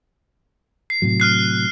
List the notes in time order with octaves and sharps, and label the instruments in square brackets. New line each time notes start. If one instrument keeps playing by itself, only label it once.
[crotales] C7
[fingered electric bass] A2 C3 F#3
[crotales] F6 F#6 C7